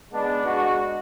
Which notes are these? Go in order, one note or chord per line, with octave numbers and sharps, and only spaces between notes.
G#3 B3 D4
G#3 D4 F#4